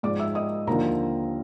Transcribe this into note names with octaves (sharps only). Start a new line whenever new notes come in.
G#2 F3 D5 D6
E5 E6
D#5 D#6
D#2 D3 F3 A#4 A#5